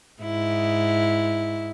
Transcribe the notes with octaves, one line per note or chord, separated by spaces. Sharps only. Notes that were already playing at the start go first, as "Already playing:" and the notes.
G#2 E4